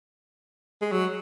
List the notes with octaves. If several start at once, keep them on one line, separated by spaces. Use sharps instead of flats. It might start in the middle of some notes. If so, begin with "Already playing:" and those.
G#3
F#3